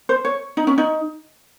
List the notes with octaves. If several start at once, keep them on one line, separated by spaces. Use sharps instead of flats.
C5
C#5
D#4
C#4
D#4